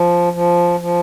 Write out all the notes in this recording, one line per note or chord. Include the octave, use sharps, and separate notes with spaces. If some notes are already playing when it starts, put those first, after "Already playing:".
Already playing: F3
F3
F3